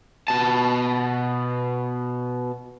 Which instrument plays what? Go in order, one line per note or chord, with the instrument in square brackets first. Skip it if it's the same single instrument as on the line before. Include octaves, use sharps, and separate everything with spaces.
[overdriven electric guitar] B2 A5